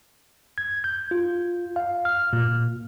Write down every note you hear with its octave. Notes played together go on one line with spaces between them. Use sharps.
G#6
G6
F4
F5
F6
A#2